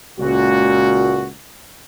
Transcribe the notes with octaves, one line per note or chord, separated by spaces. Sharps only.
C#2 A#2 F#4